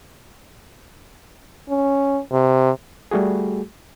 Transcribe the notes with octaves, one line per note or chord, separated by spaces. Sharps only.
C#4
C3
G3 A3 F#4 G#4